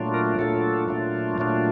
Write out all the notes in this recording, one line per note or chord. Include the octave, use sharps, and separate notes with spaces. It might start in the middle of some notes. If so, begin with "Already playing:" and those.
Already playing: A#2 F#3 A3 D4 F4
A#4
A#2 F#3 A3 D4 F4 A4
A#2 F#3 A3 D4 F4
A#2 F#3 A3 D4 F4